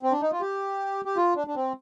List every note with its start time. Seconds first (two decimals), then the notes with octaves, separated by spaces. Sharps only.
0.03 C4
0.12 D4
0.21 D#4
0.32 F4
0.41 G4
1.05 G4
1.17 F4
1.36 D4
1.47 D4
1.56 C4